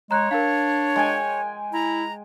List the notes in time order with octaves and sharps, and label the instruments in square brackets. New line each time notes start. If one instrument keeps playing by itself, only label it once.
[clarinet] G#3 [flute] C#5 [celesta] A#5 F#6
[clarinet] D4 [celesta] A#4 F5
[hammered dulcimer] G#3 G5 G#5
[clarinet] E4 [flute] A#5